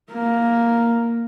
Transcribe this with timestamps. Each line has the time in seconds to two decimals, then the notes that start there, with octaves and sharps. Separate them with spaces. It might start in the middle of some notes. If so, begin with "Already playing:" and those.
0.12 A#3